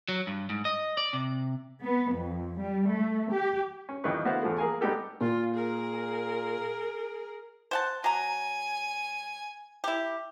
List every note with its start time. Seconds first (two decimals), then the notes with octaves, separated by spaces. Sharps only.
0.09 F#3
0.27 G2
0.50 G#2
0.65 D#5
0.97 D5
1.13 C3
1.83 B3
2.14 F2
2.59 G3
2.90 A3
3.31 G4
3.89 C#4
4.04 F2 D#3 E3 G3 B4 C#6
4.25 D3 B3 E4 F#4 C5 F5
4.43 E2 F3 A3
4.58 A#3 G#4 A#4 F5 G#5
4.81 G3 G#3 B3 D#4 G4 A4
5.21 A#2 F4
5.55 G#4 A#4
7.71 C5 F#5 A5
8.04 F#3 G#5 A#5
9.84 E4 G4